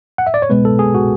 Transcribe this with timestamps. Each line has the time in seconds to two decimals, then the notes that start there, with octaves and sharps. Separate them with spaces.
0.18 F#5
0.27 E5
0.34 D5
0.42 C#5
0.49 B2 G#3 B3 B4
0.65 A4
0.79 G#4
0.95 F#4